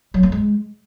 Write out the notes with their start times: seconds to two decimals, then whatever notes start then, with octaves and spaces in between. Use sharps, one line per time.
0.14 F#3
0.23 A#3
0.32 G#3